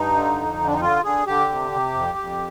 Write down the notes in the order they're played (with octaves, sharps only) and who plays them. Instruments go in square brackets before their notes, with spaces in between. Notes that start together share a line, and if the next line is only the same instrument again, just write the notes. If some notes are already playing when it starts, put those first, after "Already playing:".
Already playing: [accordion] G2 D#4
D3
F2
D3
D4
D#4
D3 F4
D3 G#4
D3 G4
C3
C3
F2
F2